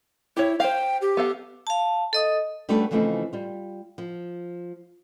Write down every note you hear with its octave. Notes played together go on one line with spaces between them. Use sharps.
E4 G4 C#5
C5 F5 G5
G4
B3 A4 F5
F5 A5
A4 D#5 D#6
G3 A3 C#4 D4 F#4 B4
C#3 E3 F3 A3 C4 D#4
G3 F4
F3